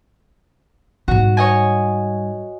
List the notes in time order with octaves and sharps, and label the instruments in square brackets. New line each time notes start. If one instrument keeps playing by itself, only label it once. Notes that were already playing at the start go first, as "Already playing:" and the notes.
[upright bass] G#2 G3 [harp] F#4
[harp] C#5 D#5 G#5